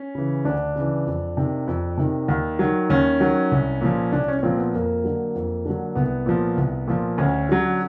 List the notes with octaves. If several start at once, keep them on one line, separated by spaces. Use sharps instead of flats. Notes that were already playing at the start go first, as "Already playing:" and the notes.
Already playing: C#4
C#3 E3
D2 D4
C#3 E3
F2
C3 D#3
F2
C3 D#3
D#2
D#3 F#3
D#2 C#4
D#3 F#3
C2
A#2 F3
C2 D4
C#4
C#4
A#2 F3 C4
B3
F2 A#3
D3 F#3
F2
D3 F#3
C2 B3
A#2 F3
C2
A#2 F3
D2 C#4
D3 F#3